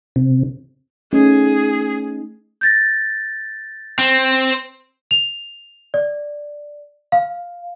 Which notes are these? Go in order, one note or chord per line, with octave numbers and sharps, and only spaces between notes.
C3
A3 C#4 D#4 G#4
G6 A6 A#6
C4
F7
D5
F5